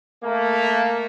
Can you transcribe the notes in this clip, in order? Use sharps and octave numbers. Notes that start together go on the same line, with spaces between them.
A3 A#3